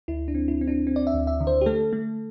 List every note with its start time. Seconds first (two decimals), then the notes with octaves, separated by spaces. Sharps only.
0.08 D2 E4
0.28 D4
0.35 C4
0.48 E4
0.61 C4
0.68 D4
0.87 C4
0.96 D5
1.07 E5
1.14 D2
1.27 E5
1.40 D3
1.47 C5
1.61 G4
1.66 A3 A4
1.93 A3